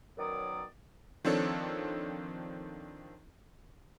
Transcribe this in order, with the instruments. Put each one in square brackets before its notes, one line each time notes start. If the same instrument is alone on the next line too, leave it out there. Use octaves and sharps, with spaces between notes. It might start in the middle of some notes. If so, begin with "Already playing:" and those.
[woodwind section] F#2 B2 D#3 F#3 D5 D#6
[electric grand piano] D#3 F3 C4 D4 A4 C#5